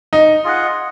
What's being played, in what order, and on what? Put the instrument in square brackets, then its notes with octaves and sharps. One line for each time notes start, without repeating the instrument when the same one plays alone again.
[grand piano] D#4
[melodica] F4 G#4 D#5 F#5